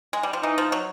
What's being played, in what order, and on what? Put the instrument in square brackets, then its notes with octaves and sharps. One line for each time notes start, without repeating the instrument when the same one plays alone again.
[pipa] G#3
G3
F3
[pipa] E3 [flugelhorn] D#4
[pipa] F3
F#3